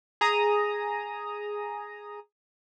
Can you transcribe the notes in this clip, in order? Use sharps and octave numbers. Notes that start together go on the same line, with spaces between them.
G#4 A#5 D#6